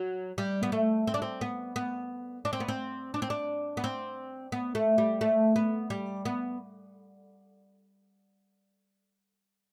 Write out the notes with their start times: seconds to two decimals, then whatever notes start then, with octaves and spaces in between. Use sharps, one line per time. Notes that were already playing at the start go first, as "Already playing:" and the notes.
Already playing: F#3
0.38 G3
0.63 B3
0.72 A3
1.07 C4
1.14 D4
1.22 C4
1.41 B3
1.76 B3
2.45 D4
2.53 C4
2.60 B3
2.68 C4
3.14 D4
3.22 C4
3.30 D4
3.77 B3
3.84 C4
4.52 B3
4.75 A3
4.98 G3
5.21 A3
5.56 B3
5.90 G3
6.25 B3